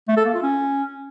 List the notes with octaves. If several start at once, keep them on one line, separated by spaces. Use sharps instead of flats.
A3
A4
A#3
F4
C#4